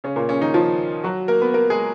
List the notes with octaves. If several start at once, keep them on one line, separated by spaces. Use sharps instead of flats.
C#3 C#4
A#2 A#3
C#3 C#4
D#3 D#4
F3 F4
F#3 F#4
A#3 A#4
B3 B4
A#3 A#4
G#3 G#4